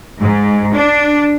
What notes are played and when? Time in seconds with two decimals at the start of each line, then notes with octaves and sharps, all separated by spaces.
0.20 G#2
0.73 D4